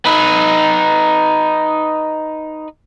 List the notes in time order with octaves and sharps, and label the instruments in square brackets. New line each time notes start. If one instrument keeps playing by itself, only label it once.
[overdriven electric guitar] D#4 B4